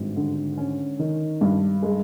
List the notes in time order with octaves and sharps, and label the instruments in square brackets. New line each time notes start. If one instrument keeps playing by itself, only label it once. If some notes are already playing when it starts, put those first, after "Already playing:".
Already playing: [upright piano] G#1 G2
D3
C#4
D#3
G2
G#3